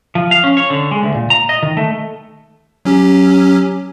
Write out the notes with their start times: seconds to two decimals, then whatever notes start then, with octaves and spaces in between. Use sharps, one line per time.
0.15 F3
0.31 F5
0.44 C#4
0.57 C#5
0.70 D3
0.91 G#3
1.03 D2
1.14 A#2
1.30 A#5
1.49 D#5
1.63 D#3
1.77 A3
2.85 F#3 C#4 G4